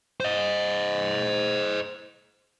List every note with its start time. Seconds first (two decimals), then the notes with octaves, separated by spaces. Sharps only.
0.20 C5 D#5